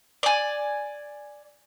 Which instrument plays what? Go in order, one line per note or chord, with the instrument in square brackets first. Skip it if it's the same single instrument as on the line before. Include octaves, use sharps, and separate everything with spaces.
[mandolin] D5 G#5